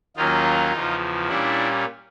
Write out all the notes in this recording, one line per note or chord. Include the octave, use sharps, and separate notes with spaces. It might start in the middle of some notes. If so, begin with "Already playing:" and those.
D#2 D#3 F#3 A#3 C#4 D#4 F4
E2 C#3 F3
A#2 G3 A#3 C#4 D4 E4